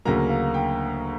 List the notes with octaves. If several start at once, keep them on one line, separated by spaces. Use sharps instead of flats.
D2 C#3 F#3 A#3 A#5
F5
G5